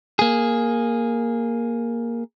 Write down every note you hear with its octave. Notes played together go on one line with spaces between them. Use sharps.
A#3 G#4